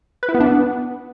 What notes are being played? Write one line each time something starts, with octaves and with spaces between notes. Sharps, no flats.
B4
E4
B3
D4
B3